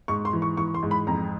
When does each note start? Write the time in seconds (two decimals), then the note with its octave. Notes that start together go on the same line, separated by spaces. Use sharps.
0.08 G#2 C#6
0.25 C6
0.33 E3
0.42 C#6
0.57 E3 C#6
0.74 C6
0.83 G#2
0.91 B5
1.07 F2 A#5